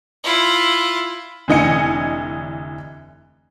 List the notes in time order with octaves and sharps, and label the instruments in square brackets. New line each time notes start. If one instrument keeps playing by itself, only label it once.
[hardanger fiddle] E4 F4
[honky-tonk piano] F1 D3 E3 D#5 G#5 C#7